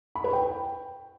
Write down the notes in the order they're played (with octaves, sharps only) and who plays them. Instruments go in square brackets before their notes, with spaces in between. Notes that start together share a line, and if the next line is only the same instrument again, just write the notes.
[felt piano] B5
B4
G5